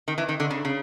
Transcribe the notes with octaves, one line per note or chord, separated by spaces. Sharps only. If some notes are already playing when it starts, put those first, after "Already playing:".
D#3
E3
D#3
D3
C#3
C#3